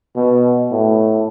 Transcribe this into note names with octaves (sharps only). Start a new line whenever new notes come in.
B2
A2